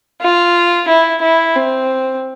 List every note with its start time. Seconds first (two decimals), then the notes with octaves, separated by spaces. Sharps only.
0.21 F4
0.88 E4
1.22 E4
1.55 C4